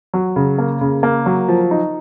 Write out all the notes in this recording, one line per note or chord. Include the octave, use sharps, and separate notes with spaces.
F#3
C#3
A#3
C#3
A#3
F#3
F3
D#4